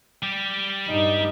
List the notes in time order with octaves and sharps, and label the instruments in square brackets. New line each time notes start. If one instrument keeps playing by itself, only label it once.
[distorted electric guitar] G3 G4
[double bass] G2 D#4